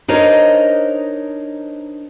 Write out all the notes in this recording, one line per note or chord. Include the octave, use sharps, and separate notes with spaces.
D4 D#4 A#4 C5 C#5 D#5